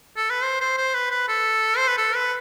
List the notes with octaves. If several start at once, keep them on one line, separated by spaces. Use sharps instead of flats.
A4
B4
C5
C5
C5
B4
B4
A4
C5
B4
A4
B4